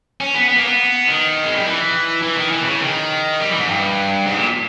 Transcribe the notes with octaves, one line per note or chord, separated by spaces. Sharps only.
C#4
B3
B3
A#3
B3
D#3
G#3
G3
E3
E3
D#3
E3
B2
C#3
D#3
G3
E3
G#2
G2
G#2
A#2